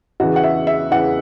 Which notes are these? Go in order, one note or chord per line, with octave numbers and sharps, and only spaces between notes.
E2 C#3 E3 F#4
F#5
E5
E5
E2 C#3 E3 F#5